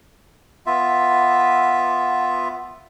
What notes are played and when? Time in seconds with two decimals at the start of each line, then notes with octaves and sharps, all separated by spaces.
0.66 B3 F4 E5